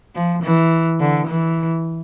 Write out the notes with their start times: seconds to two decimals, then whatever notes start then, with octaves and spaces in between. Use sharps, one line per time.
0.15 F3
0.42 E3
1.00 D3
1.27 E3